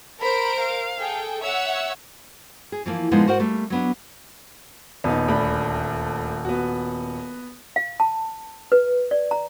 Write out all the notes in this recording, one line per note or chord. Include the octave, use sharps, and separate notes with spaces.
A#4 C5 B5 D7
F5
G#4 A4 G5
C#5 E5 F#5 E6
G#4
E3 F3 A#3
A#2 D3 F3 G#3 B3 D#4
G#2 F#4 A#4 C5 F#5
G3 A3 A#3
F#3 B3 D4
D#1 B3 D#4
D2 D4 B5
B3 F#4
F5
A5
B4
D5
A#5